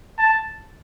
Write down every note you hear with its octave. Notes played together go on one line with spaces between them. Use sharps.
A5